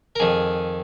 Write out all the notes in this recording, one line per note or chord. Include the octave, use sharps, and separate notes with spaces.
A#4
F2 D#3 G#4